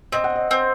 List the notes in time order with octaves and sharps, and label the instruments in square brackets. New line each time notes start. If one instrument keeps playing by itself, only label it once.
[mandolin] C4 [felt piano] D#5
[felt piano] F#5
D#5
[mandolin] C4